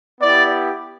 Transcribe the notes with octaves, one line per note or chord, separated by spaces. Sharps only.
B3 E4 G4 D5